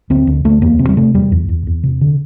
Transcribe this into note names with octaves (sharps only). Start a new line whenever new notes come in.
D2 C4
D2
D2 A3
E2 A#3
C3 C4
G3
C3 A3
E2 G3
E2
E2
E2
C3
D3